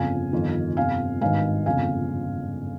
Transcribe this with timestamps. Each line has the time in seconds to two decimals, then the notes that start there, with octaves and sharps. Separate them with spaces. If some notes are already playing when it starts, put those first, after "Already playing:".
Already playing: G1 F2 C#3 F5 G#5
0.32 G1 F2 C3 D#3
0.77 G1 F2 C3 F5 G#5
1.21 G#1 G2 D#3 F5 G#5
1.66 G1 F2 C#3 F5 G#5